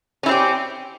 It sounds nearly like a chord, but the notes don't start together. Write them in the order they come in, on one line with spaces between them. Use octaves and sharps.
C#4 E4 C4 G4